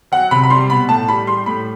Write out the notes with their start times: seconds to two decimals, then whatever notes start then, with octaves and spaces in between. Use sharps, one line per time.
0.12 F#3 F#5
0.31 C3 B5
0.44 B5
0.50 G3 C6
0.69 B2 B5
0.88 A2 A5
1.08 G3 B5
1.27 G3 C6
1.46 A2 B5